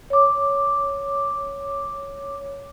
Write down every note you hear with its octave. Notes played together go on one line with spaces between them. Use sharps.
C#5 D6